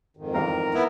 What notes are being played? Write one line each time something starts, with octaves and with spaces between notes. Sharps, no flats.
F2 G#2 D#3
E2 G3 A#4 F5
B3 E4